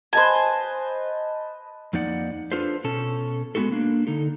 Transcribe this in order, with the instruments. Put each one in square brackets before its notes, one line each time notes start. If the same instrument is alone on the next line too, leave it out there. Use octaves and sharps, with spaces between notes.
[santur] B4 D#5 A5 [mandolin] C5 G#5
[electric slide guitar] F2 A#3 D#4 D5 F#5
D4 F4 A4 B4 C5
B2 C#4 A4
G#3 B3 C4 E4 F#4 A4
A#3 D4
D3 D#4 A4